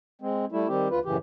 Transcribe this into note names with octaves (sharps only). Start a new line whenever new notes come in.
G#3 C4
G3 A3 E4
D#3 G3 C4 G4
D2 F4 B4
F#2 A2 C#3 E3 G4